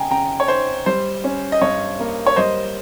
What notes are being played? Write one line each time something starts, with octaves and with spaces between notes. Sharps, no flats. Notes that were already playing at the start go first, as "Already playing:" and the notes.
Already playing: C#3 G#3 G5 G#5 A#5
C#3 G5 A#5
C#5
D#4 C5
G3 C5
C#4
D#5
G2 C#5
A#3
C#5
G3 C5 D#5